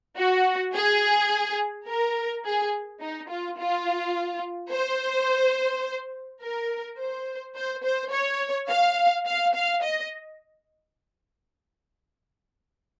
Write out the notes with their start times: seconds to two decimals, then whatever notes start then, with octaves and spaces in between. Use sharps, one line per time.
0.17 F#4
0.73 G#4
1.87 A#4
2.44 G#4
3.01 D#4
3.29 F4
3.58 F4
4.72 C5
6.42 A#4
6.99 C5
7.55 C5
7.84 C5
8.12 C#5
8.69 F5
9.27 F5
9.54 F5
9.83 D#5